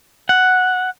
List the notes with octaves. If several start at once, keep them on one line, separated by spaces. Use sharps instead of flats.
F#5